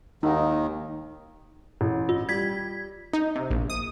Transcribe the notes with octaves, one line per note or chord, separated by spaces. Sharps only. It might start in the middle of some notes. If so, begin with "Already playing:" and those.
D#2 D#3 D#4
A1
F4
G3 G#6 B6
D#4
C3
A#1
D#6